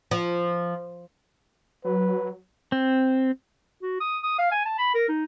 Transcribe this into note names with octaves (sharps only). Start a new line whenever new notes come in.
F3
F#3 B4
C4
F#4
D#6
D#6
F5
G#5
A5
B5
A#4
D#4